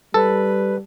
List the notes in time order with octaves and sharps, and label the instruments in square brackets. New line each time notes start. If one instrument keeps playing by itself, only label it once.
[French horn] G3 [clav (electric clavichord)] A4 [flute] B4